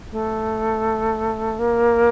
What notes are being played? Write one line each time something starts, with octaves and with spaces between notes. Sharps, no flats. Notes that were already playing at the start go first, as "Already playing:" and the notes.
A3
A#3